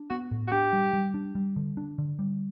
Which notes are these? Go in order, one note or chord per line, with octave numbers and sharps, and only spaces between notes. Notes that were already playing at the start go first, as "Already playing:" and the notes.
Already playing: D4
B3 F#4
A2
F#4
D4 G4
G3
G3
D4
G3
D3
D4
D3
G3